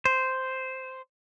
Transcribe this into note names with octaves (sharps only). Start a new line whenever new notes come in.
C5